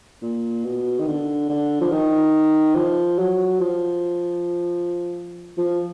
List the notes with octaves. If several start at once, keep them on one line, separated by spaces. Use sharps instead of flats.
A#2
B2
D#3
D3
D3
F3
D#3
F3
F#3
F3
F3